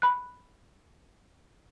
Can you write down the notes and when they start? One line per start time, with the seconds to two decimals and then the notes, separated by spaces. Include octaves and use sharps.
0.02 B5 F#6